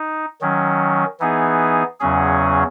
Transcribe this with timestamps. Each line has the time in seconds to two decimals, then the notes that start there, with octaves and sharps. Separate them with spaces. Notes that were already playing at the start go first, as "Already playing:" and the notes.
Already playing: D#4
0.41 D#3 F#3 C#4
1.20 E3 B3 D#4 G#4
2.00 E2 C#3 F#3 C#4 G#4